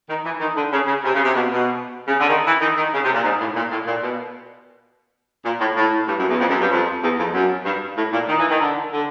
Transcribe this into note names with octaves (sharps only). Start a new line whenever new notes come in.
D#3
E3
D#3
D3
C#3
C#3
C3
C#3
C3
B2
B2
C#3
D3
D#3
E3
D#3
D#3
C#3
C3
A#2
G#2
A2
A#2
A2
A#2
B2
A#2
A2
A2
G2
F#2
E2
F2
F#2
G2
F2
E2
F2
F#2
G2
A2
A#2
D#3
E3
D#3
D3
D3